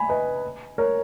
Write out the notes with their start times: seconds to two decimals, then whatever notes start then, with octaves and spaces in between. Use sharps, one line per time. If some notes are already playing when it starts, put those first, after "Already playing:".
Already playing: G#5 B5
0.09 B4 D#5
0.78 A#4 C#5